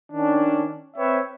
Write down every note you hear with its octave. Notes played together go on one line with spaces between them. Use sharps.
D#3 C#4 D4
C4 B4 C#5 E5 G5